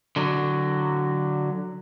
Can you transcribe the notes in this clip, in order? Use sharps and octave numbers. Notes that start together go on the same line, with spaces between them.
D3 F#3